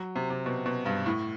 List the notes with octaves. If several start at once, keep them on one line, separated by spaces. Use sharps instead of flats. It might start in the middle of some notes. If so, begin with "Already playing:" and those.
Already playing: F#3
C3
C3
B2
B2
G2
A2